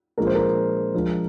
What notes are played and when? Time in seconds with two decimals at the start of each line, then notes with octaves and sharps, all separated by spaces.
0.18 A#2 F3 G#3 D4 A#4
0.27 C5
0.35 A#4
0.94 F3 G#3 D4